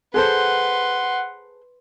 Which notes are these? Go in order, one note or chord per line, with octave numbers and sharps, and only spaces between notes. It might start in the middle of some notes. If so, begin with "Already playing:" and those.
G#4 A4 B4 C5 F#5 C6